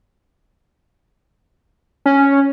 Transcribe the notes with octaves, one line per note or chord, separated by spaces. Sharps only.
C#4